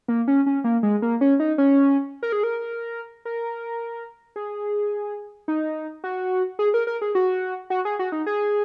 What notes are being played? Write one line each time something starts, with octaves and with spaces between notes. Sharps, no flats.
A#3
C#4
C#4
A#3
G#3
A#3
C#4
D#4
C#4
A#4
G#4
A#4
A#4
G#4
D#4
F#4
G#4
A#4
A#4
G#4
F#4
F#4
G#4
F#4
D#4
G#4